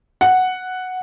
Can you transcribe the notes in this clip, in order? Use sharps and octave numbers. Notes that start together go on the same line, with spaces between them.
F#5